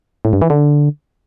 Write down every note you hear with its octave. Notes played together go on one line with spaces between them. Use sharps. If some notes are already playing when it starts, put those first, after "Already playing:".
A2
G2
E3
D3